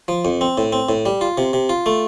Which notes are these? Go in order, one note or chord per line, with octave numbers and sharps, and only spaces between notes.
F3
F2
C4
A2
C4
A2
G3
F4
C3
C3
F4
A3